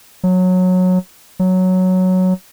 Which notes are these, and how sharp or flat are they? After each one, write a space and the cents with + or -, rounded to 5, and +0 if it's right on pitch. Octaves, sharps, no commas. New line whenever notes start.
F#3 -15
F#3 +0